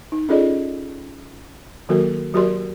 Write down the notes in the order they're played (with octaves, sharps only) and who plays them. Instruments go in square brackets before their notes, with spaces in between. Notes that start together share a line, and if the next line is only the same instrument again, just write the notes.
[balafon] D#4
C#4 F4 G#4 A4 D5 D#5
D#3 F#3 A#3 F#4 A4 A#4
F#3 F#4 G4 A#4 D5 C6